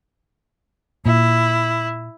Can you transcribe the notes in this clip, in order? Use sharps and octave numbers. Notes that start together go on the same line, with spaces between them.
A#2 E4